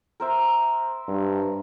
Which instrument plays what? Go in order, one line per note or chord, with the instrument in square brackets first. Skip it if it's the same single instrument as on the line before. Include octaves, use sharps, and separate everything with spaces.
[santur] A#4 C5 E5
[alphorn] G2